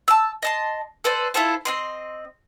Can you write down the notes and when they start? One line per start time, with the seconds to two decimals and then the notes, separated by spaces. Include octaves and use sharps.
0.08 A5 E6
0.42 D#5 A5 C6
1.04 A4 B4 C5 D5
1.34 E4 F4 A4 C5
1.65 C4 D#5 C6